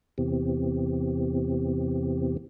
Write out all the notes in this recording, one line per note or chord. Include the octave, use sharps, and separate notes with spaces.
E2 C3